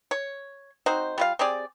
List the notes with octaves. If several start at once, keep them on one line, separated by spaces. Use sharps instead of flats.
C#5
C4 D#4 F#4 C5
G3 F4 F5
C4 G4 G#4 D5